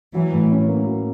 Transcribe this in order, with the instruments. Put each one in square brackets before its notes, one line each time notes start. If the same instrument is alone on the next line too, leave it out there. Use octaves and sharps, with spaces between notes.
[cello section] E3 [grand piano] F#3
[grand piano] A2
C#4
A#3
F#3